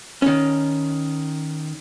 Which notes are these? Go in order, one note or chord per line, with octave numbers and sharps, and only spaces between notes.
D#3 C#4